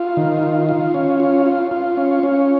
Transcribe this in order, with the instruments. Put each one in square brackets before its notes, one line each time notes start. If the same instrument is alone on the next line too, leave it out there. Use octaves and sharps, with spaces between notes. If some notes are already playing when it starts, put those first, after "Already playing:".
Already playing: [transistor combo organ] F4
D#3
F4
F4
C#4
F4
F4
F4
C#4
C#4